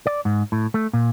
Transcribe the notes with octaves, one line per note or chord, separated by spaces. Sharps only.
D5
G#2
A2
A3
A#2